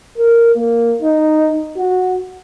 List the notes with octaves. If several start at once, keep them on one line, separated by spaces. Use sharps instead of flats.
A#4
A#3
D#4
F#4